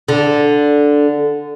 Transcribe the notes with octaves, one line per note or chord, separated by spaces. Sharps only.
D3